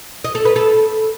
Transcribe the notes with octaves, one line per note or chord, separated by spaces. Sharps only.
D#5
A4
B4
A4